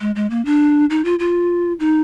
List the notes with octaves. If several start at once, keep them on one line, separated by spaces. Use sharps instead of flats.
G#3
G#3
A#3
D4
D#4
F4
F4
D#4